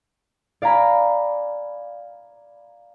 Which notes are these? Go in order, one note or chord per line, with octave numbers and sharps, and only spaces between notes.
D5 F5 G#5 A#5 B5